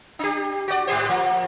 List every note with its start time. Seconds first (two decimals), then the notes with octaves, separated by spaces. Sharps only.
0.19 D4 G4
0.68 F#4 D5
0.87 G#2 G4 C5
1.09 F3 A#3